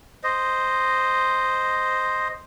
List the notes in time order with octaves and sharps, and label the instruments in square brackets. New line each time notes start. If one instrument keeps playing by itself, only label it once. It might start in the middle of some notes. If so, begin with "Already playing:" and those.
[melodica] C5 D#5